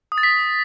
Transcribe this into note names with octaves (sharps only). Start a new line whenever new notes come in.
D#6
A6
B6